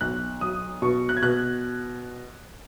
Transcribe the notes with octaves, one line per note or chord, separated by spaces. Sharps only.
B1 F#6
F#3 D#6
B2 C#6
F#6
G#6
B2 F#6